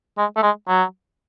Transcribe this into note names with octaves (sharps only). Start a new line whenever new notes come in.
G#3
A3
G#3
F#3